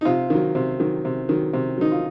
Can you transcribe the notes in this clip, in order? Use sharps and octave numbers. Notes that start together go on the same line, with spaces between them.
D#4
C3 F4
D#3 F#3
C3
D#3 F#3
C3
D#3 F#3
C3
D#3 F#3 D#4
F4